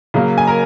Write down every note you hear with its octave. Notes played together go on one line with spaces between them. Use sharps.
C#3 F#3 A#3
G#5
A#4 A#5